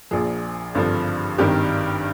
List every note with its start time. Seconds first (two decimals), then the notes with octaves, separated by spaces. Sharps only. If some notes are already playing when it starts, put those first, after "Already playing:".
0.11 A#1 A#2 F3 G#4
0.75 G#1 G2 D3 F3
1.38 G#1 G2 D#3 G4